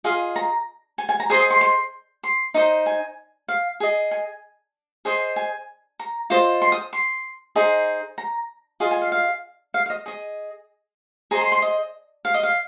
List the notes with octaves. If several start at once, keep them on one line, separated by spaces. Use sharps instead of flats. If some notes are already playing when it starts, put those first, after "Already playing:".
F4 G#4 D#5 F5
A#5
G#5
G#5
A#5
G#4 C5 D#5 D#6
D#6
C6
C6
C6
D#4 C5 D#5
G#5
F5
G#4 D#5
G#5
G#4 C5 D#5
G#5
A#5
F4 C5 D#5
C6
D#6
C6
D#4 G#4 C5 D#5
A#5
F4 G#4 D#5 F5
G#5
F5
F5
F5
F5
D#5
G#4 D#5
G#4 C5 D#5 A#5
C6
C6
D#5
F5
D#5
F5